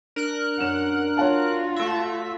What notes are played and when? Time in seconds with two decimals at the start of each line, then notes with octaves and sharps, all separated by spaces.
0.16 D4 A#4 F#6
0.59 F#2 C#4 F#5 E7
1.17 F4 F#4 C#5 F#5 A5
1.76 A3 E5